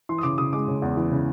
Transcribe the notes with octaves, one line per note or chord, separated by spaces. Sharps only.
E3 C6
D#6
C#3 D6
C#3 D#6
G#3 D6
C#3
E2
E3
C#3